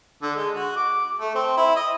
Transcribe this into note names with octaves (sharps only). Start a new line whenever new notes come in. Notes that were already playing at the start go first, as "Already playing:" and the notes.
D3
G#3
F#4
D6
A3
C4
E4
D#5